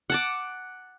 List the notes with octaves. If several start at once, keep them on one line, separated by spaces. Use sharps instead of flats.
F#5 A5 D6